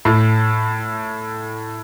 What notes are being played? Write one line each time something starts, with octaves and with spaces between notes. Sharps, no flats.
A2